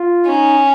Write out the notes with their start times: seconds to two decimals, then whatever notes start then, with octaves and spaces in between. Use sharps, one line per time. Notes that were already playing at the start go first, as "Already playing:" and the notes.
Already playing: F4
0.25 C#4 D#4